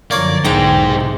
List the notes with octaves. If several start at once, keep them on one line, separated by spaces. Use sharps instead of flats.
F#2 D3 F3 A#3 C#5 D5
B1 E2 G#2 D3 D#4 G#4 G5 A#5
C3